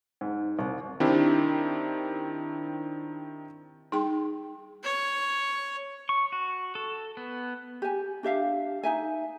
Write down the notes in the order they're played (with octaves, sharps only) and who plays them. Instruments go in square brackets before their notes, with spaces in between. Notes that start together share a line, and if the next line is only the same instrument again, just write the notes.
[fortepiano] G#2
C2
[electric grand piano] D#3 C4 D4 E4 G4
[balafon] G3 D#4 G#4 G5 C6
[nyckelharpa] C#5
[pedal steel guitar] C#6
F#4
A4
B3
[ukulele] G4 G#5
D4 G4 E5 F5
D#4 E5 G#5